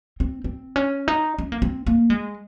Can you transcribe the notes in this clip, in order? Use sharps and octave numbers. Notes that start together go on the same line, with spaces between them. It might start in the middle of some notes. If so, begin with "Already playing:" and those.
C4
C4
C#4
D#4
C#4
A#3
C4
A#3
G#3